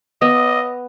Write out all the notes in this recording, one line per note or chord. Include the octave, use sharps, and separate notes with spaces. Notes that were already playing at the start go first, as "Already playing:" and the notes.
B3 D#5